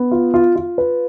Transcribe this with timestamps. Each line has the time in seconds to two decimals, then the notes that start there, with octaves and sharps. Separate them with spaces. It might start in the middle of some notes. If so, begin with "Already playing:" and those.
Already playing: B3
0.11 F4
0.34 F4
0.56 F4
0.78 B4